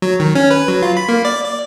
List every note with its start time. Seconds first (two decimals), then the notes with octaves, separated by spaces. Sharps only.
0.02 F#3
0.20 D#3
0.35 C#4
0.51 B4
0.68 F#3
0.82 F4
0.97 B5
1.09 A#3
1.25 D5
1.44 D5